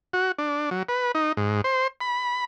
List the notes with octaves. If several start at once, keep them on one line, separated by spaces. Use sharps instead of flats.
F#4
D4
F#3
B4
D#4
G#2
C5
B5